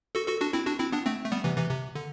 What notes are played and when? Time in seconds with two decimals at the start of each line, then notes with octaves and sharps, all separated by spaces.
0.15 F#4 A4
0.28 F#4 A4
0.41 D4 F#4
0.53 C4 E4
0.66 D4 F#4
0.79 C4 E4
0.92 B3 D4
1.06 A3 C4
1.25 A3
1.32 G3 B3
1.44 C3 E3
1.57 C3 E3
1.71 C3
1.95 D3